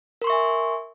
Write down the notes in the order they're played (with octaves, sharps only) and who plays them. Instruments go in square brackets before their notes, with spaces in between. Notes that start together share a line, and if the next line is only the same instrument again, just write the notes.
[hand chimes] A#4
C6
C#6
E5
G#5